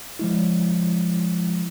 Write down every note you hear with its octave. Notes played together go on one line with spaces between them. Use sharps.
F3 G#3 E4